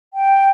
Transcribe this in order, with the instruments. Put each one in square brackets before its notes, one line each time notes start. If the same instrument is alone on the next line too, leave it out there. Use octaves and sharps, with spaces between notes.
[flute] G5